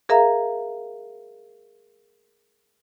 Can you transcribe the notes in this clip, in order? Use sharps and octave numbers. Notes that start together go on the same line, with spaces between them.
G#4 A#4 E5 F5 A#5